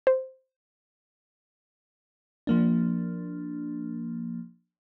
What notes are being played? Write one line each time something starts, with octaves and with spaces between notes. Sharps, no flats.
C5
F3 A#3 D4